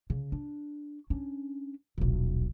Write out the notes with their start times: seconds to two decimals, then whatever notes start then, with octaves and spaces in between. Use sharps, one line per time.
0.10 C#3
0.32 D4
1.10 C#4 D4
1.98 D#1 B1